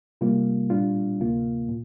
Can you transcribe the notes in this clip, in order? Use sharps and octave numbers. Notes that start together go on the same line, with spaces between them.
C3 G3 A#3 F4
A#2 G3 D4 F4
D2 C3 A#3 F4
A#2